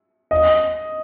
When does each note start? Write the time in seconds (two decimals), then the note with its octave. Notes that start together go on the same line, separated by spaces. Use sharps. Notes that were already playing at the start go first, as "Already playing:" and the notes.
0.31 D#5